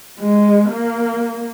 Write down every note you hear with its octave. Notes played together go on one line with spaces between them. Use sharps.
G#3
A#3